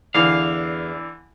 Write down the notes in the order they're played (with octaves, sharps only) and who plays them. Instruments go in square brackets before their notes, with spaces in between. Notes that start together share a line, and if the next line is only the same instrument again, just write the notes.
[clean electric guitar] E2 F5 [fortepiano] D3 E3